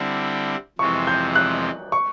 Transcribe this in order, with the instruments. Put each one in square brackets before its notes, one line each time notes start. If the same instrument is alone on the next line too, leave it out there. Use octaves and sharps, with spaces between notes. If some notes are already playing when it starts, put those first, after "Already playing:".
Already playing: [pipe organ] D3 G3 C4 E4
[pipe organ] F2 C3 E3 G#3 C4 [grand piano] C#6
[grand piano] G6
F#6
C#6